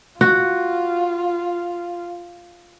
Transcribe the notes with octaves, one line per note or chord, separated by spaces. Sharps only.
F4 F#4